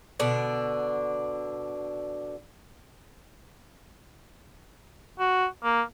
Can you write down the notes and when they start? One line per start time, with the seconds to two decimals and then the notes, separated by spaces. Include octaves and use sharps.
0.20 B2 D3 D4
5.19 F#4
5.64 A#3